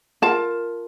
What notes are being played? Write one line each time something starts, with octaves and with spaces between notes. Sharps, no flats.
F4 A#4 A5